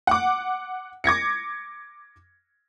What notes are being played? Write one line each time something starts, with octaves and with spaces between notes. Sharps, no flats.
F#5 D6
D6 G#6 A#6 C#7